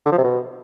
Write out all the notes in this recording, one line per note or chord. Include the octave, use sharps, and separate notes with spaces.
D3
F3
C3
B2